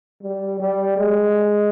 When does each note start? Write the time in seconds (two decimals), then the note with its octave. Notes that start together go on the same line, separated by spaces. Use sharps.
0.22 G3
0.60 G3
0.97 G#3